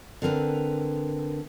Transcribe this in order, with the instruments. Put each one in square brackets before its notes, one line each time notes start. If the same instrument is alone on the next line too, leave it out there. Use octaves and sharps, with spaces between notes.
[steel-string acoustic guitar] D3 C4 A#4 B4